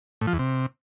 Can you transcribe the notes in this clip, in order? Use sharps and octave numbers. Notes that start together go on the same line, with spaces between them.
A2
F3
E2
C3